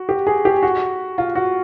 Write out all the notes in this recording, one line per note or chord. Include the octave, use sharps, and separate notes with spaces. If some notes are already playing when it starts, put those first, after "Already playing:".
Already playing: F#4
G4
G#4
G4
F#4
F4
F#4